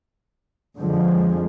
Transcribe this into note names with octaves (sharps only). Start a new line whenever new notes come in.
F2 D3 F3 G#3